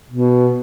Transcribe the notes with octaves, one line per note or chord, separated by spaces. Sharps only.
B2